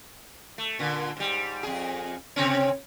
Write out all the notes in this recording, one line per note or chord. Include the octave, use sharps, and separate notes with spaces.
A3
A#2 D3
G#2 G3
F2 G#4
C3 C4 C#4